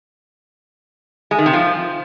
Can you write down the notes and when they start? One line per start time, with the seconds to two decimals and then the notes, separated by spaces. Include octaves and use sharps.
1.31 G#3
1.38 D#3
1.46 C3
1.53 F3